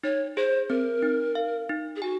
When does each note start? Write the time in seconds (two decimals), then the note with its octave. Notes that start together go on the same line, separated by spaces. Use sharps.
0.03 D#4 C#5
0.36 G#4 C5
0.70 C4 A#4
1.03 D#4
1.35 F5
1.69 D#4
1.96 G#4
2.02 F#4 G#5